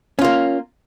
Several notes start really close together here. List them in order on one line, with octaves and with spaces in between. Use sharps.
C#4 F4 A#3